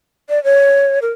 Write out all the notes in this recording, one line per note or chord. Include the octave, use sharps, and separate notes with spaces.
D5
C#5
A#4